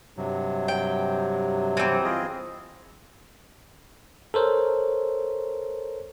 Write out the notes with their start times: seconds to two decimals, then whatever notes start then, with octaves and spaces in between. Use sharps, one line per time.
0.17 G2 C3 F#3
0.68 G5
1.77 E3 C4
2.04 F4 G#4 D#5
4.34 A4 A#4 C5 C#5